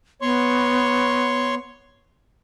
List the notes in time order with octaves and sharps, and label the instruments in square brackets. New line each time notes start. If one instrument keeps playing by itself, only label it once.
[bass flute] B3 [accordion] C#5 C6 C#6